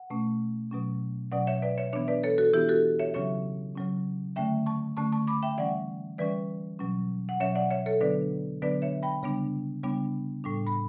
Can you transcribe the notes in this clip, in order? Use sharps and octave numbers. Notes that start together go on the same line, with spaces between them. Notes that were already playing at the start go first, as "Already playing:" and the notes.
Already playing: F#5
B2 A3 C#4
B2 F#3 C#4
B2 F#3 C#4 D5 F#5
C#5 E5
B4 D5
C#5 E5
E3 B3 D4 C#5 E5
B4 D5
A4 C#5
F#4 A4
E3 B3 D4 E4 G4
F#4 A4
C#5 E5
C#3 F#3 C#4 C#5 E5
C#3 F#3 C#4
D3 A3 C#4 E5 G5
A5 C#6
D3 A3 C#4 A5 C#6
A5 C#6
B5 D6
E5 G5
E3 G3 C#4 D5 F#5
E3 G3 C#4 B4 D5
B2 F#3 C#4
F#5
B2 F#3 C#4 C#5 E5
D5 F#5
C#5 E5
A4 C#5
D3 F#3 B3 D4 B4 D5
D3 F#3 B3 D4 B4 D5
C#5 E5
G5 B5
C#3 G3 B3 D4
C#3 G3 B3 D4
A2 G3 D4
B5